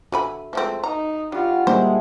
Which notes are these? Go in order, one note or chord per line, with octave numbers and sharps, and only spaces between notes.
D3 F#4 E5 G#5 B5
F3 G#3 A3 C4
D#4 A#5
G3 D4 F4 F#4
G3 G#3 A#3 D4 E4 C5